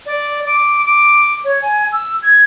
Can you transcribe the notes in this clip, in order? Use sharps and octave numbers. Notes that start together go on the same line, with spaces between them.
D5
D6
D6
C#5
G#5
E6
G#6